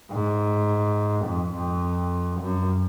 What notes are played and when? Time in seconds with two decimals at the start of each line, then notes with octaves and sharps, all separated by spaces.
0.12 G#2
1.26 F2
1.54 F2
2.41 F#2